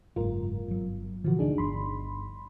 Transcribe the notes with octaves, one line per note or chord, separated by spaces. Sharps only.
F#1 G#2 F4 A#4
G1 F#3
A#2 D3 E3 F3 F#4
D2 D3 D4 D#4 G#4
G1 B5 C6